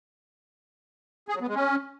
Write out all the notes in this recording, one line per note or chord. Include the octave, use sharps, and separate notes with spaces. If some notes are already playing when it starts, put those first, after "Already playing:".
G#4
F#3
B3
G#3
C#4